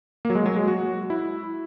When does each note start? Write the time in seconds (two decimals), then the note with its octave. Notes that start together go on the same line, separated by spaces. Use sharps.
0.25 A#3
0.30 F#3
0.35 G#3
0.46 F#3
0.56 G#3
0.68 F#4
1.10 E4